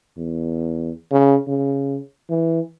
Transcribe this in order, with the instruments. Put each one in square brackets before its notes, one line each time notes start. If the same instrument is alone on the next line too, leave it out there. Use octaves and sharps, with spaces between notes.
[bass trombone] E2
C#3
C#3
E3